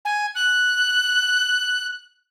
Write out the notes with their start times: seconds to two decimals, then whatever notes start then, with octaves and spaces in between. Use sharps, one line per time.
0.05 G#5
0.35 F#6